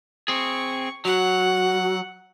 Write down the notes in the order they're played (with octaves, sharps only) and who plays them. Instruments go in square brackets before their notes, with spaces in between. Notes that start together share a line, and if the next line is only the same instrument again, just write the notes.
[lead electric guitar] C4 G#4 [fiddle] C#6
[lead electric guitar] F#3 [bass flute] F#4 [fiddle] F#5